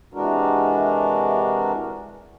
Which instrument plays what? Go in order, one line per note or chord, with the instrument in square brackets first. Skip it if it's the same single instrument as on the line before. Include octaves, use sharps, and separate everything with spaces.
[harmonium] C3 E3 G#3 D4 F#4 A#4